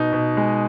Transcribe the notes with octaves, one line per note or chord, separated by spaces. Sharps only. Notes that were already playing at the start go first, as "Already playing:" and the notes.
Already playing: B2 D#4
B2
G#3